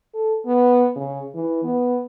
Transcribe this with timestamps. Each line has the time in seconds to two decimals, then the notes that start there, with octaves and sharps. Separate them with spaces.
0.14 A4
0.46 B3
0.96 C#3
1.35 E3
1.64 B3